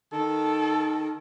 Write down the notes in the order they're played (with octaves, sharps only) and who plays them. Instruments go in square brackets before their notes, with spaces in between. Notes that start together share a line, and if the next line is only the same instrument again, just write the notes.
[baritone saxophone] D#3 [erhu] A4